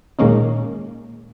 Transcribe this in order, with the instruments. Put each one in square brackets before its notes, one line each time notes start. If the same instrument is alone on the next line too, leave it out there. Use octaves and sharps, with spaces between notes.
[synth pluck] A#2 D#3 G#3 A#3 C#4 D#4